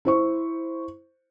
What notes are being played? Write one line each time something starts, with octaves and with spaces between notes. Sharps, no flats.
E4 C5 C#6